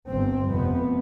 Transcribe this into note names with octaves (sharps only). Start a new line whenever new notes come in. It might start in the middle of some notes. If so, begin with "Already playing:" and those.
G1 G2 C4
F1 F2 C3 B3